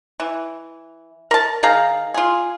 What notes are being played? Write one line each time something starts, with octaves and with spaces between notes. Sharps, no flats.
E3
A#4 A5
D#3 G#4 F5 A#5
F4 G#4